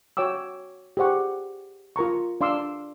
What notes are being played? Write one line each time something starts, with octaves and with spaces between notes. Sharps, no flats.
F#4 C#5 G5 D6 E6
G4 G#4 C5 F#5 C#6
F4 A#4 A#5 C#6
D4 F5 C6 D6 E6